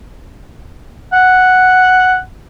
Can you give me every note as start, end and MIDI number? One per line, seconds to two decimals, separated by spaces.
1.13 2.17 78